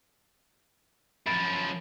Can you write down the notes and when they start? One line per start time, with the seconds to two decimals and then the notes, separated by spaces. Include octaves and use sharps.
1.27 F#2 F3 B5 A6 D7